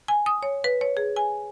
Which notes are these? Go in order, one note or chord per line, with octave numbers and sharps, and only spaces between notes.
G#5
D#6
C#5
B4
C#5
G#4
G#5